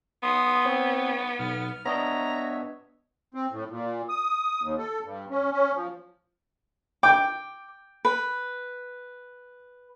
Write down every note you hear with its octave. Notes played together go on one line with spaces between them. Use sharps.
B3 C6 D#6
C4 C#5
B1 F6
B3 D4 C#5 D#5 E5 A#5
C4
A2
A#2
D#6
D#2
A4
G2
C#4
C#4
F3
G5 D6
B4